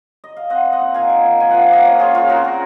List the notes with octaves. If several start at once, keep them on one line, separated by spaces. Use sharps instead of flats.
D#5
F5
C4 D#5 F#5
C4
D#5 F#5
A#2
D#3 F5 G#5
D#3
D#3
F3 G#5
F3 F#5
F5
A#3 D#5 F#5
C#4 C#5 F5
C#4 F4 G#4
C#3 F4 G#4
C4 F#4 A#4
A#2